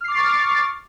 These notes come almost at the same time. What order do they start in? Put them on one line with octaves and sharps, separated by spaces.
F6 C7 D6 A6 C#6